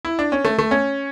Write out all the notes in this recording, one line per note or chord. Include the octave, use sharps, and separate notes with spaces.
E4
D4
C#4
A3
A3
C#4